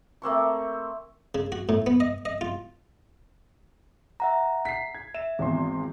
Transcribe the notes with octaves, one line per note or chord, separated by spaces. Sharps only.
A3 A#3 C4 C#6
C#3
F#4
A2
B3
D#5
D#5
F4
E5 F#5 A#5
B6 C7
G#6
E5 E7
G#1 E2 C4 C6